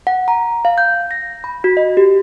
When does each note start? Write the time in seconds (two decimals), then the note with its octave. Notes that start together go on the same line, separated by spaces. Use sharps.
0.07 F#5
0.28 A#5
0.65 F5
0.78 G6
1.11 A#6
1.44 B5
1.64 F#4
1.77 D#5
1.97 G4